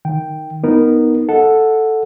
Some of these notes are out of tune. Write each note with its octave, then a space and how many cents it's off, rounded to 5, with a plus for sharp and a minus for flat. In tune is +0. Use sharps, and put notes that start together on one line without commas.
D#3 +0 G5 +0
B3 -5 D#4 +0 A#4 +0
A4 +0 D#5 +20 F#5 -10